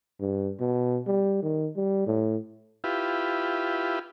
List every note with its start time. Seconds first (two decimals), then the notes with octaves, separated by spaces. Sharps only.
0.20 G2
0.60 B2
1.07 G3
1.43 D#3
1.76 G3
2.07 A2
2.84 E4 F4 G4 B4